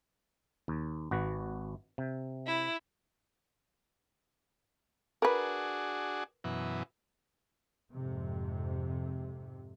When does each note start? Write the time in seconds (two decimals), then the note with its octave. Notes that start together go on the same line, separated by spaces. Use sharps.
0.68 D#2
1.11 G#1 F#4 B4
1.98 C3
2.47 E4
5.22 D4 F#4 G#4 A#4 B4
6.44 F#2 B2 E3
7.93 F2 G#2 C3